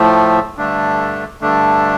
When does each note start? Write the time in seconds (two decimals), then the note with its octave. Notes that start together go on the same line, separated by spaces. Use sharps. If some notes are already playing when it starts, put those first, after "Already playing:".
Already playing: A2 F3 A3
0.56 G2 D3 A3 D4
1.41 G2 D3 A3 D4